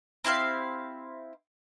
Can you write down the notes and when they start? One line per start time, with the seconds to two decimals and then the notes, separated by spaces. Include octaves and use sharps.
0.24 C4 E4 G4 F5